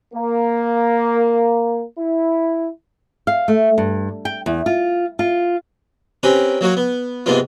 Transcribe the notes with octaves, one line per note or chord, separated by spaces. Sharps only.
A#3
E4
F5
A3
G2
G5
E2
F4
F4
C4 C#4 G4 A#4 B4
F#3 A#3 F#4 C#5
B3
G#2 C3 A#3 B3 F4